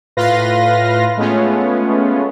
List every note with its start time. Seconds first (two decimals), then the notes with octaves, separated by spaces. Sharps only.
0.17 A2 F4 B4 F5 C6 A#6
1.17 G#3 A3 B3 C#4 F4